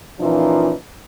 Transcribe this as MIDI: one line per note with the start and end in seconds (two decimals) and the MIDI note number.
0.19 0.71 46
0.19 0.71 52
0.19 0.71 53
0.19 0.71 61
0.19 0.71 63